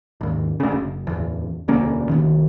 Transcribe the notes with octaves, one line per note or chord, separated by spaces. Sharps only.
G#1 D#2
D2 C#3
F#1
D1 E2
E1 D2 A#3 C#4
C2 F#2 D#3